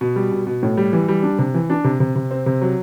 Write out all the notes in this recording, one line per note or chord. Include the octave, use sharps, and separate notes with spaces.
B2
G3
B2
B2
A2
G3
E3
G3
D4
C3
E3
D4
C3
C3
C3
C4
C3
F#3